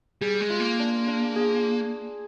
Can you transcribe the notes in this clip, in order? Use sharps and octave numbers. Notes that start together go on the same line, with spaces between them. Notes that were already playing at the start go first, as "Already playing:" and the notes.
G3 G#4
G#3
F4
A#3
D4
D4
G#4